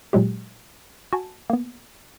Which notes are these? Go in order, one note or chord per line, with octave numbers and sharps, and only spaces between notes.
A#2 F#3 G#3 G4
F#4 G#5 A5
A#3 B3